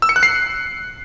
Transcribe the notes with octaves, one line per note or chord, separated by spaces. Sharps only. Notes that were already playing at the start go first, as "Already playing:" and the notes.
E6
C#7
F#6
C7